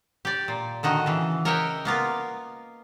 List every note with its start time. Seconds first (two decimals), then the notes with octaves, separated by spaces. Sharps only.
0.25 G4 D5
0.48 A#2
0.83 D3 D#3 F#4 D#5
1.06 C#3 E3
1.45 A#4 C#5 D#5 E5 F#5 G5
1.85 A#3 B3 F4 A#4